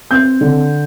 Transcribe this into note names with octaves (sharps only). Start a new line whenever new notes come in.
C4 G6
D3